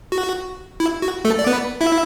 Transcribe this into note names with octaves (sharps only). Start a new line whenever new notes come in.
F#4
E4
F#4
A3 A4
D5
B3 B4
E4 E5